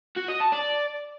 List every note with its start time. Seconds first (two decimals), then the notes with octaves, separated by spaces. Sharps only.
0.17 F#4
0.29 D#5
0.41 A5
0.53 D5